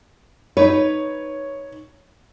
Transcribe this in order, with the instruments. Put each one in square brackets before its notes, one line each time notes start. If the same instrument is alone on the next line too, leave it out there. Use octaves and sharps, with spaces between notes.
[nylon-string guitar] D#4 B4 [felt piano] C#5